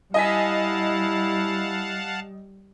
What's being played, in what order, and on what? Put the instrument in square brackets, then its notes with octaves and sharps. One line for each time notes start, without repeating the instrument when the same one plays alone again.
[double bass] G3 [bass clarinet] E4 [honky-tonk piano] D#5 G#5 B6 [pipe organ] F5 F#5 A5